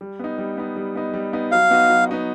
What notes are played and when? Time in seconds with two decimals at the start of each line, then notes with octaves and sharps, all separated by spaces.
0.01 G3
0.19 B3 D#4
0.38 G3
0.57 B3 D#4
0.76 G3
0.96 B3 D#4
1.14 G3
1.33 B3 D#4
1.51 F#3 F5
1.70 B3 D#4 F#4
1.90 F#3
2.09 B3 D#4 F#4